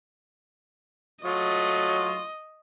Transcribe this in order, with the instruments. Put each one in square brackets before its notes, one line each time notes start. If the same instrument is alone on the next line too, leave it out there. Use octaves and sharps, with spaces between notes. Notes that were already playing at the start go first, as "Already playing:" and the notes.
[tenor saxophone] F#3 [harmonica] A3 F4 C#6 [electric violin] D#5